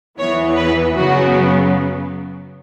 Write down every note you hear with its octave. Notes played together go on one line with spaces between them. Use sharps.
E2 E3 B3 C#5
B4
F#2 C#3 F#3 B3 F#4